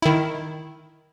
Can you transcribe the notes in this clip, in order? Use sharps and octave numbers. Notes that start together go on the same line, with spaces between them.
D#3 E4